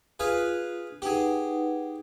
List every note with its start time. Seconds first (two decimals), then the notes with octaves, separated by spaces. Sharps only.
0.19 F4 G#4 B4 F5
1.02 D#4 G4 G#4 B4 F#5